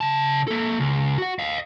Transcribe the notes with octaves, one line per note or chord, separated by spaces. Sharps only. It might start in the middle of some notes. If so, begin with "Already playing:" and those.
C#3 A5
A#3 A4
C#2
F#4 F#5
D#5 F5